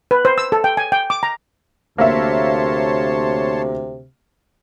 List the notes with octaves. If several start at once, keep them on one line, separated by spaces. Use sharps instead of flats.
B4
C5
E6
A4
G5
G#5
G5
D6
A#5
D2 C3 A#3 C#5 E5 A5 C6